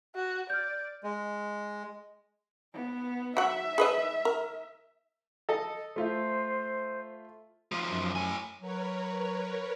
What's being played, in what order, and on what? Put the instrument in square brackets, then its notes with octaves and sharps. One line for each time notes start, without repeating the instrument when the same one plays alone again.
[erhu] F#4
[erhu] D5 [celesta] F6 G6
[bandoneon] G#3
[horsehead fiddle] B3
[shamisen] F#3 F#5 [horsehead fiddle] E5
[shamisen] G#4 B4 D#5
A#4
[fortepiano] A4 D#5
[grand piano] A3 F4 E5 [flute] C5
[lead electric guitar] B1 F3
[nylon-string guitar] F#2
[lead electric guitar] A2 G#5
[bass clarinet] F#3 [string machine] A#4 B4 C#5